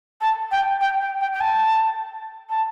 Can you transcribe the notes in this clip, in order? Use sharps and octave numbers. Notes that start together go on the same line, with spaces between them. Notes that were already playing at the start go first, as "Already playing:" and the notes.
A5
G5
G5
G5
G5
G5
A5
A5